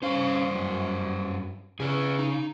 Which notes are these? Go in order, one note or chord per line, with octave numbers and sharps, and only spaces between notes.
G2 C#4 C5 F5
F#2
C#3 G#4 B4
D#4